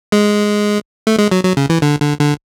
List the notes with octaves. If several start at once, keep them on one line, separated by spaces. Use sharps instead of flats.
G#3
A3
G#3
F#3
F#3
C#3
E3
D3
D3
D3